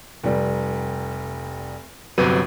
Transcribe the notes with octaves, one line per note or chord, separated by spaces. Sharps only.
F1 G3
G1 C3 F#3 B4 D#7